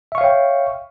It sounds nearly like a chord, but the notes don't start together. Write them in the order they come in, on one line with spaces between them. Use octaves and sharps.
E5 C#6 F5 C#5 G5